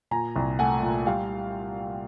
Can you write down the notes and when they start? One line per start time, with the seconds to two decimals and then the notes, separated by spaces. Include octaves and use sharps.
0.11 A#2 G#5 A#5
0.36 C2
0.59 A3 F#5 G#5
0.83 A#2
1.06 G3 F5 G5